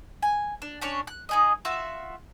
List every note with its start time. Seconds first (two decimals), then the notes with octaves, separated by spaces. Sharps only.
0.22 G#5
0.62 D4
0.81 C#4 D4 C#5
1.07 F#6
1.29 D#4 G#4 D#5
1.65 F4 F#4 E5